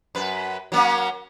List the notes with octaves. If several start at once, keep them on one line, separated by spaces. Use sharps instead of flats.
F#2 B4
F#3 A#3 C#4